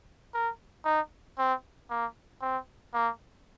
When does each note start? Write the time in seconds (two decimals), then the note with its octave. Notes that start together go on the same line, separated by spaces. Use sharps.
0.34 A#4
0.85 D#4
1.38 C4
1.90 A#3
2.41 C4
2.93 A#3